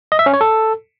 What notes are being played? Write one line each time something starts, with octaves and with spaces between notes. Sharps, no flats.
D#5
E5
C#4
C#5
A4